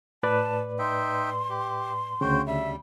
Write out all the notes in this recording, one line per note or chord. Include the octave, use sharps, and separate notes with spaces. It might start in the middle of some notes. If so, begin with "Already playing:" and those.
A2 B4 D5 A5
D#4 E5 G5 C6
G4
D2 C#3 F#4 C5 G5
G3 E5